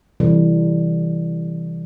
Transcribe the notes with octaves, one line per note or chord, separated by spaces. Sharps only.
C3 E3 G3 A4